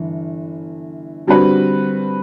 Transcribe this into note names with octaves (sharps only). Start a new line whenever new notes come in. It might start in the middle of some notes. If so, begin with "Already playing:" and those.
Already playing: G1 E3
D3 G3 C4 F#4 B4